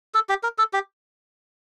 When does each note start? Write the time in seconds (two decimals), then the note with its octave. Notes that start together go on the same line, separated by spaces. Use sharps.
0.14 A4
0.29 G4
0.43 A#4
0.58 A4
0.73 G4